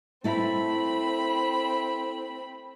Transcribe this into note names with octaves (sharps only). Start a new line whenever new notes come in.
A3 C4 E4 E5 B5